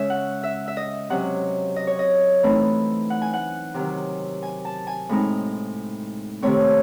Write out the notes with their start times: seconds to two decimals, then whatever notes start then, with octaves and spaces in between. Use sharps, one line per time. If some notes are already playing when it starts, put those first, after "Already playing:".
Already playing: C#3 G#3 C#4 E5
0.10 F#5
0.43 E5
0.68 E5
0.77 D#5
1.10 C3 F#3 C#4 F#5
1.76 D#5
1.87 C#5
1.99 D#5
2.43 E3 A3 C4 D#4
3.10 F#5
3.22 G#5
3.33 F#5
3.74 C3 D#3 F#3
4.43 G#5
4.65 A5
4.87 G#5
5.09 A2 G#3 C4 D#4
6.42 C3 D#3 A3 C4 C#5